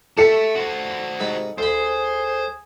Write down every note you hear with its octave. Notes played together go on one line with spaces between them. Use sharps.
A3 G4 A4 E5 A5 C#7
F#4 C5
G#2 C3 B5
D2 G#4 C5 B5